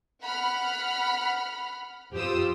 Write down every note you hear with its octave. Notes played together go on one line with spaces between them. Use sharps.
F#5 B5 F6
F2 F4 G4 C5 D#6 E6